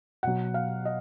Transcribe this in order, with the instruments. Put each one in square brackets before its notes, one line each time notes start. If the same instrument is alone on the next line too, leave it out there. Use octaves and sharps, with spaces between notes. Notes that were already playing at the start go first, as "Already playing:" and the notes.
[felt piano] B2 F#3 F#5
F5
D#5